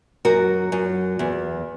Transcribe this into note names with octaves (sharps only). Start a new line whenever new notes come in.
F#2 F#4 A#4
F#2
E2